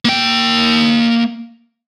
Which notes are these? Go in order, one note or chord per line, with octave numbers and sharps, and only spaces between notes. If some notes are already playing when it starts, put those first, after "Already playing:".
A#3 G5